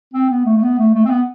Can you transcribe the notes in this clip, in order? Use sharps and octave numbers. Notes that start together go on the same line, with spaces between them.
C4
B3
A3
A3
B3
A3
A3
C4
B3